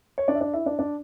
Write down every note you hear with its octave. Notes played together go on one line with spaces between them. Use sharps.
C#5
D4 D5
E5
D4 D5
E4 E5
D4 D5
D4 D5